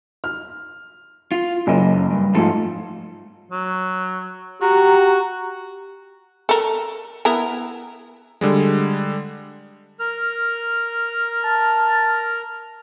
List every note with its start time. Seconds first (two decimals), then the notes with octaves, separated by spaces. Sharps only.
0.24 F6
1.32 F4
1.67 F#1 F#2 D#5
2.11 G2
2.34 G#2 F3 G#3 A3 F4 A4
3.52 F#3
4.62 F#4 G4 A#5
6.49 A4 A#4
7.25 B3 E4 A#4
8.41 D3 G3 G#3
10.00 A#4 F6
11.44 A5